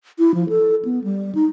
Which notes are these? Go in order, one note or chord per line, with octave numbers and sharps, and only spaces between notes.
E4
F3
A4
B3
G3
D#4